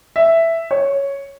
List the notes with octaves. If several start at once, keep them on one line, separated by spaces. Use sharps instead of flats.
E5
C#5